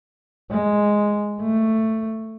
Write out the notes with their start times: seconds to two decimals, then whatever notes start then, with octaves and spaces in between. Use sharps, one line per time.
0.50 G#3
1.41 A3